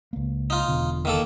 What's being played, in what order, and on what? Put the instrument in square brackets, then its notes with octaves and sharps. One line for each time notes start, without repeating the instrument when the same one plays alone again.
[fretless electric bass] C#2 A#3
[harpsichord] D#4 F4
[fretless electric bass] E1 B2 D3
[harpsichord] D#3 A#3 A4